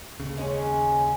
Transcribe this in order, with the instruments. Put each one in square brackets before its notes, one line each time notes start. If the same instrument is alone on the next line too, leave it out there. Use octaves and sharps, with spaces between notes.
[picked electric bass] D#2 C#3
[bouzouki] G#3 B3 C#4